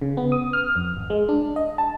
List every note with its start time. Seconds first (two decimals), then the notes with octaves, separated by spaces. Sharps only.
0.01 C#3
0.17 B3
0.32 D#6
0.53 F6
0.76 F2
0.97 G#1
1.10 G#3
1.29 D4
1.56 D#5
1.78 A5